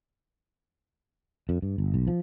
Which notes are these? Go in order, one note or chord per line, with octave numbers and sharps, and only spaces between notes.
F2
G2
G1
B1
F3